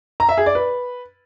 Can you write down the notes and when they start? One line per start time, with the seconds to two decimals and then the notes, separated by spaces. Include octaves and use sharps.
0.20 A#5
0.29 E5
0.37 G#4
0.46 D5
0.55 B4